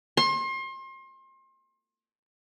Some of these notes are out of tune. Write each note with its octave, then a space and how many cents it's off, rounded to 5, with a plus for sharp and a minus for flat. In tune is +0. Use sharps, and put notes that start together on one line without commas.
C6 +35